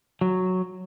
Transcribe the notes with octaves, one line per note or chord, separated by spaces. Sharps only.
F#3